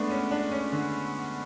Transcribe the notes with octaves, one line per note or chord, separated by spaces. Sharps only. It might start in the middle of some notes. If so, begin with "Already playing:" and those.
Already playing: G#3 A3 B3 D4
C#4
D4
C#4
D3